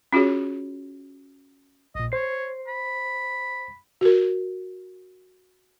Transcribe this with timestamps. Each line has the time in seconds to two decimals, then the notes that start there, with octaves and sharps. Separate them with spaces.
0.13 C#4 F4 F#4 G#4 C#5
1.95 A#1 A#2 D#5
2.12 C5 C#5 C7
2.68 B5
4.01 F#4 A#4